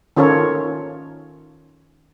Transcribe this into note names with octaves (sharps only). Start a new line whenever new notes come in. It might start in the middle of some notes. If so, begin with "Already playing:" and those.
D#3 C#4 F4 A4 A#4 C#5